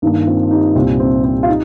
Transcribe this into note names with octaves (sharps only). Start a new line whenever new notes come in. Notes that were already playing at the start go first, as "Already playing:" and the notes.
G2 D#3 G3 A#3 D#4
C4 F4
D#4 G4
C2 A#2 G3 C4 F4
C4
C4
F4
D#4